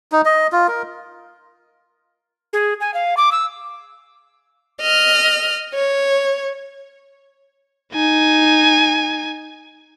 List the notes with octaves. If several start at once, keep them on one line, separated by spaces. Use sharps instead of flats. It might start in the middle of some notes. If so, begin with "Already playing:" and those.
D#4
D#5
F4
A#4
G#4
G#5
F5
D6
E6
D#5 F6
C#5
D#4 G#5